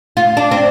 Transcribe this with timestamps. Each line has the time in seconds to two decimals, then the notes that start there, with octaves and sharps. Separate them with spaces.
0.17 F4
0.37 D4
0.51 C4